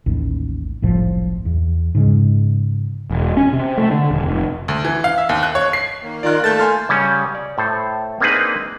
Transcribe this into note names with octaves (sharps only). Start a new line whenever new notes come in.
A1 D#2
F#1 C2 A2 F3
E2
G#2 C#3 G#3
E1
C#4
C3
A3
D3
D#1
F1
D2
E3
F5
E5
D#2
F#6
C#5
C7
D#3 A#3
D#3 F4 A#4 D5 F#6
A3 A#3 A5 G6 A6
G#5 C6 F6
C#3 G3 C#4
D5
A2 A4 C5
A#3 C4 D4 D#4 G#4 B4